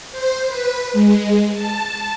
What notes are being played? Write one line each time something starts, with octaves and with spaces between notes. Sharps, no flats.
C5
B4
G#3
A5